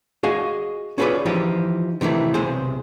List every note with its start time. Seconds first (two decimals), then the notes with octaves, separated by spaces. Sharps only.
0.23 F#4 G#4 D#5 F5 G#5
0.98 C#4 F4 G#4 A#4 B4 D5
1.25 E3 F3 D#4 F4 G4
2.01 C3 D#3 E3 A3 E4
2.34 B1 C3 G#4 C5